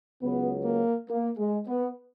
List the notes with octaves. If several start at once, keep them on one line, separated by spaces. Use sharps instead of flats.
C#2 C#3 F#3 B3
A#3
A#3
G#3
B3